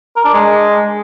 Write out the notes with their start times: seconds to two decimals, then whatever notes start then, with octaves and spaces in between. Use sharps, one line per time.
0.17 A#4
0.25 D4
0.34 G#3